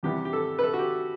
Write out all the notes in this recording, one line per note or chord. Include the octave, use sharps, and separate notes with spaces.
E2 C3 E3 G3 B3 G4
G4
A4
B4
A4
F#4
G4